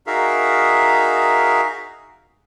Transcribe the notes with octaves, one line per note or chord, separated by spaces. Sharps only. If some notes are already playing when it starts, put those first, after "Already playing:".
D#4 F#4 G#4 A#4 E5 F5